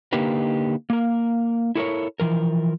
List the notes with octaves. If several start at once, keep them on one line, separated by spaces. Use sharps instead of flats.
D3 A#3 D#4 G4 A#4 B4
A#3 A#4
E4 A4 A#4 C#5
E3 F3 A#4